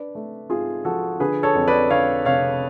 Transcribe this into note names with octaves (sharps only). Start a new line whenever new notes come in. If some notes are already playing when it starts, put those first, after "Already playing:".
Already playing: D4 B4 D5
A3
G#2 F4 G#4
F3 F#4 A4
D3 G#4 B4
A4 C#5
F2
B4 D5
D3 C#5 F5
F1 C#5 F5